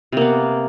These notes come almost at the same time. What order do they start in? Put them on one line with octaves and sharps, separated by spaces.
C3 A#3 B3